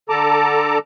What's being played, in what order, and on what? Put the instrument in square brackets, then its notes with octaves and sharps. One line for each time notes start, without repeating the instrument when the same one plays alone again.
[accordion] D3 A4 A5 A#5 D6